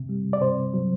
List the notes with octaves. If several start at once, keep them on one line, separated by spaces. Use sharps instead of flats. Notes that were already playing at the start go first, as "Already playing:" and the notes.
Already playing: C3
G3
D5
C3 C5
F#3